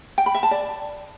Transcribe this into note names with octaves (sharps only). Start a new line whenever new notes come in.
G5
B5
E5
A5
D5